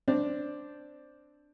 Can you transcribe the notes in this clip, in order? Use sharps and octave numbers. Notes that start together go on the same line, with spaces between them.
C4 D4